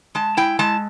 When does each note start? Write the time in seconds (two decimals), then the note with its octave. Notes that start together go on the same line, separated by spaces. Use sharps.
0.15 G#3 A5
0.37 E4 G5
0.59 G#3 A5